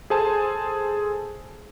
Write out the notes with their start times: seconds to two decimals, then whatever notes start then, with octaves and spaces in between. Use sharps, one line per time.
0.10 G#4 A4 C5 G#5 A5